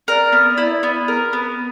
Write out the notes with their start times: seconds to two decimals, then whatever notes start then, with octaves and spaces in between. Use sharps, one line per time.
0.08 A#4 D5
0.32 B3
0.58 E4
0.83 B3
1.08 A#4
1.33 B3